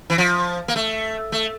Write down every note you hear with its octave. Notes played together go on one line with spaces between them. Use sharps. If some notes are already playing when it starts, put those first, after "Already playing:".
E3
F3
A#3
A3
A3